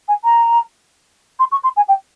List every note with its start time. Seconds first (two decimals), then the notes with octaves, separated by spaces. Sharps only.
0.08 G#5
0.24 A#5
1.39 C6
1.52 C#6
1.63 C6
1.76 G#5
1.88 G5